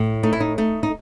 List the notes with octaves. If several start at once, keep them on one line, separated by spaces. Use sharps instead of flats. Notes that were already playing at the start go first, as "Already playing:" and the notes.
Already playing: A2
A3 D#4
E4
D#4
A3 D#4
D#4